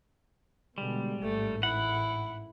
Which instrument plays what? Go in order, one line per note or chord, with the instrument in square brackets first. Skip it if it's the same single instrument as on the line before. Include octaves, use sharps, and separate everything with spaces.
[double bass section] B2 D3 G#3 [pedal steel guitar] G3
[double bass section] A1 G#2 [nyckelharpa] A3
[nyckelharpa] E4 [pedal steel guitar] F#5